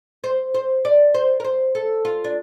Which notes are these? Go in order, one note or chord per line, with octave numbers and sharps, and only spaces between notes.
C5
C5
D5
C5
A#4
C5
A4
F4
D4